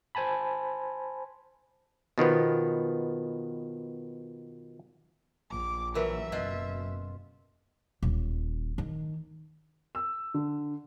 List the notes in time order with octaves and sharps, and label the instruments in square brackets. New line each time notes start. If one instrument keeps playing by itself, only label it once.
[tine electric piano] C5 G#5 A5 B5
[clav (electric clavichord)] B2 D#3 F3 B3
[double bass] A#1 [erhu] D6
[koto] E3 F#3 [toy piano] A#4 B4 [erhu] E5
[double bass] F#1 [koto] B2 F4 [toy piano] B4
[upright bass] D#1
D#3
[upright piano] E6
D3